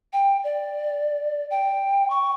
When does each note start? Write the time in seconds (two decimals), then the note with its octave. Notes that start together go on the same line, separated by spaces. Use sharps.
0.13 G5
0.44 D5
1.51 G5
2.10 C#6